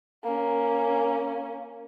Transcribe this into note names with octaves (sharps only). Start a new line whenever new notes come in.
A#3 C#4